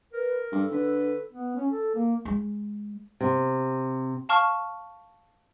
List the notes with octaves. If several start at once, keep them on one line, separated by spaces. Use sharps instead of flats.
A#4 B4
G2 A4
D3 B4
B3
C#4
A4
A#3
G#3
C3
F5 A5 C#6 F6